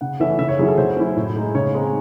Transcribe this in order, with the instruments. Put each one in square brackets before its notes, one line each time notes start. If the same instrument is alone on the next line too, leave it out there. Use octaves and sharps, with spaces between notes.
[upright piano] C#3 F#5
E3 A3 C#4 E5
C#3 E5
C#5
F#3 C#4 E4 G#4
A4
F#3 C5
C#4 E4
A2
G#3 D#4
C#3 C#5
G#3 C4 D#4